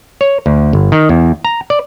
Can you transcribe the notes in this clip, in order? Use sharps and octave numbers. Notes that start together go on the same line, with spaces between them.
C#5
D2
G1
D#3
E2
A#5
D5